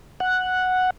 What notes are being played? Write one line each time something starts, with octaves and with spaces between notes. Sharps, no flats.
F#5